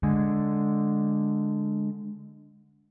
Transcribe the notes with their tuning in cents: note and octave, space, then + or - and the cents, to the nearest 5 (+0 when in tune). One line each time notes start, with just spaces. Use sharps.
D3 +0 G#3 +0